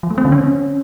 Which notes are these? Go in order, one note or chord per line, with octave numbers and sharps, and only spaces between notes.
F3
A3
C4
D3
C#4